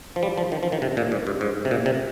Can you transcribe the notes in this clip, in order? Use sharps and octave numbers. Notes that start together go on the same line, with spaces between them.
F3
G3
F3
D#3
F3
D#3
C3
A#2
G#2
G2
G#2
C3
A#2
C3